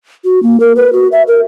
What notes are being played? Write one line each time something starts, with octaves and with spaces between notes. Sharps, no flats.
F#4
A#3
A#4
B4
F#4
E5
A#4